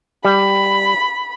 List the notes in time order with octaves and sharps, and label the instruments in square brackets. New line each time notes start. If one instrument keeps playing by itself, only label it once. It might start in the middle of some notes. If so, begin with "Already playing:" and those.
[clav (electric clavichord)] G3 [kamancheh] B5